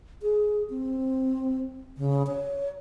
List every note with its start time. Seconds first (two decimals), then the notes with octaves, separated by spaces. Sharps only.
0.22 G#4
0.70 C4
1.97 C#3
2.27 C#5